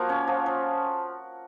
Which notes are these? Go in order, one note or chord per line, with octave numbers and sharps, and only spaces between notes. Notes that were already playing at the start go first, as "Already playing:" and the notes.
Already playing: F3 A#3 F#4 A#4
C#4
F3
F3